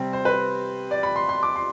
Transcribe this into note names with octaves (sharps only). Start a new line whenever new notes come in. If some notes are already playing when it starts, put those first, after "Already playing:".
Already playing: C3 G3 C4
C5
B4
D5
B5
C6
C6
D6
C6